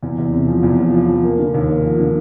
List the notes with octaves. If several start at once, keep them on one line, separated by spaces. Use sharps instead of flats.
E2
E2
C3
F3
E2
F3
F3
F3
A#3
D3
D#2
A#3
F3
D3